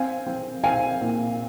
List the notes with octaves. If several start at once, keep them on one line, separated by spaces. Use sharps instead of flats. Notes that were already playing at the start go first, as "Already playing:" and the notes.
Already playing: C4 F5 G#5
C4
C4 F5 G#5
A#2